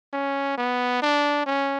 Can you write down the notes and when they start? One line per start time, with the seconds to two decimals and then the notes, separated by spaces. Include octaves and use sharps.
0.14 C#4
0.58 B3
1.02 D4
1.46 C#4